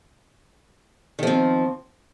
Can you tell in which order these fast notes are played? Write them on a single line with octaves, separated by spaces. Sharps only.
D#3 F3 C4